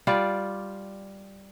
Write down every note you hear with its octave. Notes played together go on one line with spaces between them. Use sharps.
G3 F4 D5